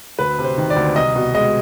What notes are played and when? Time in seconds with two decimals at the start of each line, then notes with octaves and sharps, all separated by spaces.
0.19 D2 B4
0.38 C3
0.44 C5
0.58 D#3
0.70 D5
0.76 D2
0.96 C2 D#5
1.15 B2
1.34 G#3 D#5